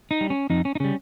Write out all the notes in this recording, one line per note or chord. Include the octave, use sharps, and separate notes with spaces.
D#4
G3
C#4
F2 D#4
C#4
D#4
C#3 G3 C#4